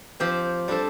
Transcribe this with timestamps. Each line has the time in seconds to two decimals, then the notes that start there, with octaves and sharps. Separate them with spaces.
0.20 F3 C4 G4 C5
0.68 G3 D4 A4 C5